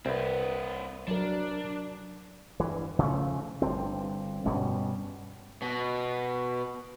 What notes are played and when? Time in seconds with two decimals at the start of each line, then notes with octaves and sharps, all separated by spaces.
0.06 C2 C4 B4
1.08 F#3 D4 A#4
2.60 G2 E3
2.99 C#3 F3 F#3 A3
3.62 G1 G2 D3 C4
4.46 G2 B2 G3 C#4
5.62 B2